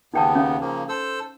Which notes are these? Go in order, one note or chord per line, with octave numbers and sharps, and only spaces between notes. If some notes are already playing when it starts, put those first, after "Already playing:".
D#2 C#3 B3 D#4 G5 A5
C#4 F5
C#3 F3 A#3
A4 C5 E6